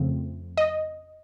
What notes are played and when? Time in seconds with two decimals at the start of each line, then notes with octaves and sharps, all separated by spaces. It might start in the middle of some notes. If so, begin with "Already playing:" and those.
Already playing: F2 C#3 F3 A3 C4
0.57 D#5